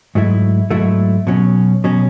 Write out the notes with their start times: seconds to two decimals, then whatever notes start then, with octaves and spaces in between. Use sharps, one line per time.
0.15 G#2 F#3 A3 E4
0.71 G#2 F#3 A3 E4
1.27 B2 F#3 C#4
1.84 B2 F#3 C#4